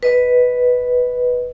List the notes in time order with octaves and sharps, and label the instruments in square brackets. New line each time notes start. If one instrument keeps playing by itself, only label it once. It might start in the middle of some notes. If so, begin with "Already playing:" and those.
[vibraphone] B4 D#5